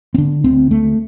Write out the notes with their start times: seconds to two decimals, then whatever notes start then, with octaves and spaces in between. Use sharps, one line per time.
0.14 C4
0.18 D3 D4
0.44 D2 C4
0.71 D2 A3